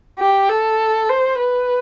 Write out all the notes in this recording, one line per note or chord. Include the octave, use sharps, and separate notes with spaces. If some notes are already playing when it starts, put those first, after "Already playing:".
G4
A4
C5
B4